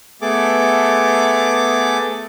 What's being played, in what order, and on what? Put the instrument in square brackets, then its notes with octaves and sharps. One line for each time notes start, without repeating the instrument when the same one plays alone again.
[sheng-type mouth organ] A3 B3 G#4 A4 D6